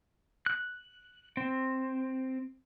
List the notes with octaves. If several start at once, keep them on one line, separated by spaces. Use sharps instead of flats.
F#6
C4